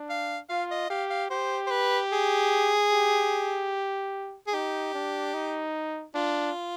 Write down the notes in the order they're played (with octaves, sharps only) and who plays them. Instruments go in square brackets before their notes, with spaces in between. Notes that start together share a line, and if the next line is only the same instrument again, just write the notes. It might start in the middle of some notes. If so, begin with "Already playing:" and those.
Already playing: [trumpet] D4
[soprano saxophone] F5
[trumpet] F4 [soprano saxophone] F5
[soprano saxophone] D#5
[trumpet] G4 [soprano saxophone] F5
[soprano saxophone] F5
[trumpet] G4 [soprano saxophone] C5
[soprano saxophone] C5
B4
G#4
[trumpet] G4
[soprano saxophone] G#4
[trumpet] D#4 [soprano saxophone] G4
[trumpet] D4
D#4
[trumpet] D4 [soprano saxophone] F4